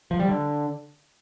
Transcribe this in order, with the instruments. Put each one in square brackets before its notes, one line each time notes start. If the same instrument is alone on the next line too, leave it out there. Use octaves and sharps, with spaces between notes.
[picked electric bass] F3
G3
D3